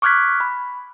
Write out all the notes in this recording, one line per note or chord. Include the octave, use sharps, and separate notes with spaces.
C#6 D6 F6 F#6 G#6 B6
B5